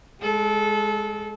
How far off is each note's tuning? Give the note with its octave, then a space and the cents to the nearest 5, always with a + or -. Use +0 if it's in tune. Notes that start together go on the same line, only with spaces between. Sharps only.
G#3 +0 A4 -25